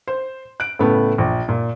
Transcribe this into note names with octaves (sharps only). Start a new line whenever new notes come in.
C5
F#6 D7
A2 C#3 A3 B3
A#1
A#2